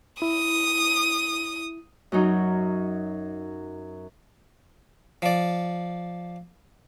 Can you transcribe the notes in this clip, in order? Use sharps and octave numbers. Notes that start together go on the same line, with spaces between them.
E4 D#6
F#2 F#3 D#4
F3 D5